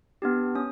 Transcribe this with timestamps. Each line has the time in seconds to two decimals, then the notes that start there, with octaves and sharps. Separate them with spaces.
0.22 B3 D4 G4
0.55 C#4 D#6